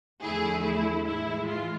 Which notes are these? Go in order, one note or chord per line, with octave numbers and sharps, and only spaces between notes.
E2 D3 F3 A3 E4 G#4
E4
A2 E3 G#3 E4
F4